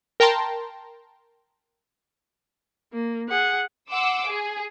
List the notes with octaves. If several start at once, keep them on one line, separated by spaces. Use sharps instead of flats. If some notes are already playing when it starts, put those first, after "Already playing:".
A#4 G5 A5 A#5 C6
A#3
G#4 F#5
F#5 C6 D6 E6
G#4